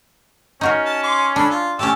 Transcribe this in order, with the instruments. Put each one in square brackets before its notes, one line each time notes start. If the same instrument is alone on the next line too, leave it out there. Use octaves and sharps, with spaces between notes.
[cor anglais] C#4 [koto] D#4 F#4 A#4
[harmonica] A5
C6 D6
[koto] D4 [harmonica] A4 B5
[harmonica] F4
[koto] A2 C#4 [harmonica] G4 A5 E6